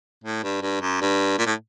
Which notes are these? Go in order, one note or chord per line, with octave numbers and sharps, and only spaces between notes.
A2
G2
G2
F#2
G2
A#2
A2